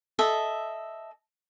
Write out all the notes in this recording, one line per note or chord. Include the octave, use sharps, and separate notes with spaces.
A4 D#5 E5